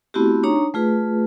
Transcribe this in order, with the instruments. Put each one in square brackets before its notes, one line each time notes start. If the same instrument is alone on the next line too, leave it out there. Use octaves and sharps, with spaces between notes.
[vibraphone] A3 B3 C4 E4 F#4 G4
D4 D#4 C#5 A#5 C#6
A3 F4 G#4 B4